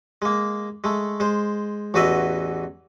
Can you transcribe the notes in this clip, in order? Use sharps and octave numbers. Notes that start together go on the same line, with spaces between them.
G#3 A#3
G#3 A3
G#3 C5
A1 E2 F#4 B4 D#5 E5